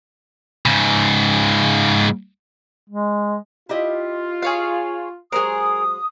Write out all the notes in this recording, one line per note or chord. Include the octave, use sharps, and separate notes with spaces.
G#2 C#3
G#3
E4 F4 G4 D#5
G#4 C#5 F5
F#3 G#3 G#4 A#4 C5 D#6